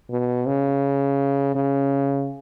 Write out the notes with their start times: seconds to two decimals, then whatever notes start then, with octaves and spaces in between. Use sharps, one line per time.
0.11 B2
0.48 C#3
1.55 C#3